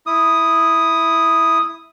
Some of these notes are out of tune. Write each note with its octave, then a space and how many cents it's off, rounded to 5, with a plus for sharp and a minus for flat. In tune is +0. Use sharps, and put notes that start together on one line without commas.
E4 +0 D#6 +0